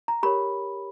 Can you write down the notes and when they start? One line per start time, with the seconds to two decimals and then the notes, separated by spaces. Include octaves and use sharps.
0.08 A#5
0.23 G4 A#4 C#5 B5